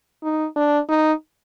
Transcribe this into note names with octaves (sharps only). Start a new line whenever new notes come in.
D#4
D4
D#4